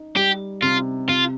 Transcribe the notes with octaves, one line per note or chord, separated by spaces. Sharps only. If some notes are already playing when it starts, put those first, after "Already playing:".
Already playing: D#4
G3 G4
C3 F4
C3 F4